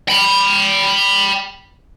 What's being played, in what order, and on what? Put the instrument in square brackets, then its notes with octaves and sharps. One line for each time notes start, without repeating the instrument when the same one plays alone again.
[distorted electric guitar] G5 B5